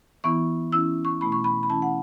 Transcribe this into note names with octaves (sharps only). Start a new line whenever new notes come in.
E3 B3 E4 C#6
E3 C#4 E4 E6
C#6
B2 A3 E4 B5
C#6
B5
B5
E3 C#4 E4 A5
F#5